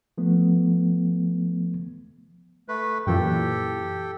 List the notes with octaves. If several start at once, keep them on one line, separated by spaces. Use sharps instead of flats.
F3 A3 B3
A3 B4
F#2 A#2 E3 G4 A4 G5